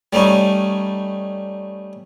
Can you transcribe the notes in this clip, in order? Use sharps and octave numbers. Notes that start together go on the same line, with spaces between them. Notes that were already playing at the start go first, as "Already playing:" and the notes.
G3 A3 C#4 D#4